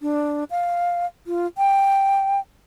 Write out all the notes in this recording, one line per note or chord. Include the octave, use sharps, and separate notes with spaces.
D4
F5
F4
G5